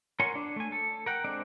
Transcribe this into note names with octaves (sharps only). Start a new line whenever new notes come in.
A#4 C#5 F#5 G#5 C6
D4
A3 G#5
A4
A#4 F#5 G5
G#3 C4 D4 D5